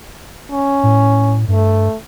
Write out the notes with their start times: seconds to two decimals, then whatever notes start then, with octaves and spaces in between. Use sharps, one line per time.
0.52 C#4
0.83 A2
1.48 G2 A3